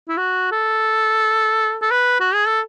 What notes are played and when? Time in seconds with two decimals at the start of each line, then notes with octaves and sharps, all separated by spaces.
0.08 E4
0.17 F#4
0.52 A4
1.82 A4
1.91 B4
2.21 F#4
2.34 G#4
2.47 A4